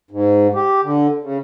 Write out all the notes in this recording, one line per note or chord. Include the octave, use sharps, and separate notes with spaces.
G#2
G4
D3
C#3